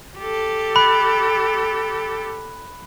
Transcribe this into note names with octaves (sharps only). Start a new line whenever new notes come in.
G4 A4
B5 F#6